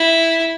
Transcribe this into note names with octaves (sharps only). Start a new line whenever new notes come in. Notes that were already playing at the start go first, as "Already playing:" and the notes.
Already playing: E4